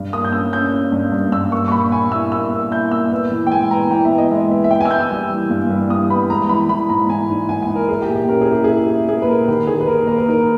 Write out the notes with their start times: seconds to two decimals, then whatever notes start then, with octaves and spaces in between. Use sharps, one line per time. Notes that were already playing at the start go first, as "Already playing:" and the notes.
Already playing: G2
0.13 A#3 D#6
0.24 G6
0.33 C#4 E6
0.53 C#4 G6
0.73 C#4
0.92 G2
1.12 G2
1.32 G2 E6
1.52 A#3 C#6
1.68 C#6
1.72 A#2 B5
1.91 A#2 G#5
2.11 E4 E6
2.32 A#3 E6
2.52 A#3
2.71 E4 G6
2.91 A#2 E6
3.11 B3
3.32 E3
3.47 G5
3.51 G#3 G#5
3.71 B3 A#5
3.90 E3 G5
4.05 E5
4.11 B3
4.18 D#5
4.31 G#3 D#5
4.51 B3 E5
4.64 E5
4.71 B3 G5
4.81 G#5
4.85 E6
4.91 B3 G6
5.00 E6
5.11 G3
5.30 E3
5.50 G2
5.70 G3
5.90 E3 D#6
6.10 B3 B5
6.30 G#3 A#5
6.49 E3 B5
6.69 E3 B5
6.89 G#2 A#5
7.10 E3 G#5
7.30 D#4
7.49 G#2 G#5
7.62 G#5
7.69 D#4
7.75 A#4
7.89 E4 G#4
8.02 G4
8.09 A#2
8.16 G4
8.29 C#4 A#4
8.41 G#4
8.49 E4 G4
8.64 E4 G#4
8.89 A#3
9.08 A#3 G#4
9.22 B4
9.28 A#2 A#4
9.48 D#3 G4
9.67 D#3 G#4
9.81 B4
9.87 A#3 A#4
10.07 A#3 A#4
10.18 B4
10.28 D#4 A#4